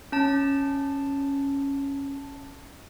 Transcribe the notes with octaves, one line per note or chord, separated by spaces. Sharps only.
C#4 A5